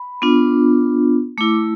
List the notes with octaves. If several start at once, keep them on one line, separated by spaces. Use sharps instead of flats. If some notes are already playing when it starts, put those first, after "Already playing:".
Already playing: B5
B3 D4 F4
A3 E4 D6